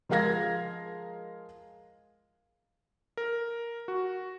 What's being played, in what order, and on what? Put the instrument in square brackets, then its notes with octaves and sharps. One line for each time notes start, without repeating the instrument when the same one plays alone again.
[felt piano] F3 G#3 A#4 F5 G#6 A#6
[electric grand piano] A#4
F#4